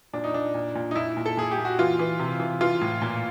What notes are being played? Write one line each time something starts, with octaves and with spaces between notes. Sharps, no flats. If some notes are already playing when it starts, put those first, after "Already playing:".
A#2 D4
D#4
A#2 D4
A#2
A#2
D#4
A#2 E4
A#2
A4
A#2 G#4
G4
A#2
F#4
E3 F4
E3
C3
E3
E3 F4
A2
A#2